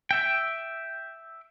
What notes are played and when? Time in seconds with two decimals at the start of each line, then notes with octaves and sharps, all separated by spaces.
0.11 E5 G5